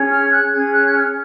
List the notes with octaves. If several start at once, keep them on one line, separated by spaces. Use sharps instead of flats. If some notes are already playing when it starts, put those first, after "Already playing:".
Already playing: C#4 G#4 C#5
F6
F#6
C#4 G#4 C#5 G#6
F#6
F6